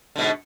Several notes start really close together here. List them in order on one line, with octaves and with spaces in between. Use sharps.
D3 B2 G#2